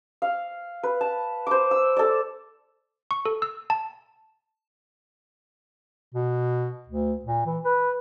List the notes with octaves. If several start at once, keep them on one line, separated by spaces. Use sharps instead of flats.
F5
B4
A5
C5 D6
E6
A4 D5
C#6
A4
E6
A5
B2
D2
A#2
E3
B4